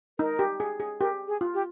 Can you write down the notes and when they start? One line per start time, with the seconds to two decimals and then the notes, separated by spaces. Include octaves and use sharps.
0.19 D#4 A#4
0.39 G4
0.60 G#4
0.80 G#4
1.00 G4 A#4
1.28 G#4
1.41 F4
1.54 G4